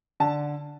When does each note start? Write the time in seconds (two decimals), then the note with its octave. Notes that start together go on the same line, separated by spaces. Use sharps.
0.20 D3 A5